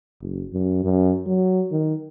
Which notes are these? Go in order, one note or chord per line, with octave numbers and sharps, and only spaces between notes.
F#1
F#2
F#2
F#3
D#3